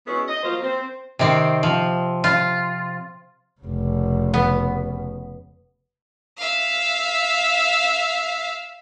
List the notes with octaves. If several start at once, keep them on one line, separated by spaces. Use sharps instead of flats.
G#3 B3 C#4 E4 F#4 G#4
D#5
F3 F#3 A#3 F4 C5
C4 C5
C3 D#3 C4
F3
F4
F1 C#3
B3
E5 F5